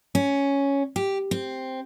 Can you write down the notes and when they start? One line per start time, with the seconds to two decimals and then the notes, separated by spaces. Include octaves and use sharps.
0.15 C#4
0.96 G4
1.31 C4